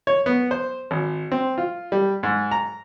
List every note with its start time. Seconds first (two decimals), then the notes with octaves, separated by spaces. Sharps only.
0.07 C#5
0.26 B3
0.51 C5
0.91 G#1
1.32 C4
1.58 F4
1.92 G3
2.23 G#2
2.51 A#5